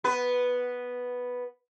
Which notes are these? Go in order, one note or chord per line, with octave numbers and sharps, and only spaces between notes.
B3 B4